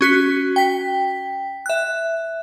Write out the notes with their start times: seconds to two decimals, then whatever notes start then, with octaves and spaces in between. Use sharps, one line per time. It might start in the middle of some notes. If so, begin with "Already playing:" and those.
0.01 C#4 F#4 B6
0.56 G5 B6
1.66 E5 F#6